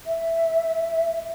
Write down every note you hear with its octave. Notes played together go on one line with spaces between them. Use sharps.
E5